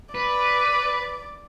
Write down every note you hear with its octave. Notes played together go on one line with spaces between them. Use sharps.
B4 D5